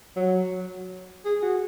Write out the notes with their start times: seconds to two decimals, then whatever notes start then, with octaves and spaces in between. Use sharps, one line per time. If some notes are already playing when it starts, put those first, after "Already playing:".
0.16 F#3
1.25 G#4
1.42 F#4